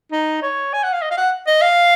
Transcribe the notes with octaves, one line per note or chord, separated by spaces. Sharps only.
D#4
C#5
G#5
F#5
F5
D#5
F5
F#5
D#5
F5